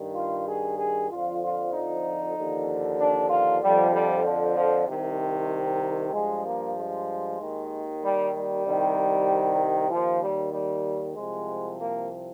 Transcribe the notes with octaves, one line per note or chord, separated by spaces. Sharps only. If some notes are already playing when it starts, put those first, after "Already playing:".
Already playing: G2 D#3
F4
G#4
G#4
F2 D3 F3 F4
F4
D#4
D#2 D3 F3
D4
F4
F2 D3 F3 G3
G3
F3
F3
C2 C3 D#3
G2 F3 G#3
A#3
G#3
D#2 D#3
G3
G3
C2 C3 D#3
D#2 D#3 F3
G3
G3
C2 C3 F3 G#3
A#3